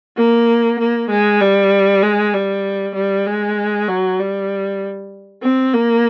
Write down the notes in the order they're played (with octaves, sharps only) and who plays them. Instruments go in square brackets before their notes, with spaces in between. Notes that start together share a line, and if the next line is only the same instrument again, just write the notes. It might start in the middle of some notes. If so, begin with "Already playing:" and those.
[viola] A#3
A#3
G#3
G3
G#3
G3
G3
G#3
F#3
G3
C4
A#3